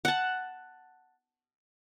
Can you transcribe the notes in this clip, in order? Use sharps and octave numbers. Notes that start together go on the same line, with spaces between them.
F#5 A5